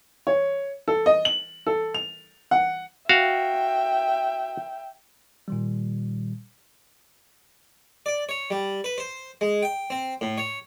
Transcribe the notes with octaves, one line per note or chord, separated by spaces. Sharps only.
C#5
A4
D#5
F#7
A4
F7
F#5
F#4 E5 F5 G5
A#2 D#3 G3
D5
C#5
G3
B4
C5
G#3
G5
C4
A2
C#5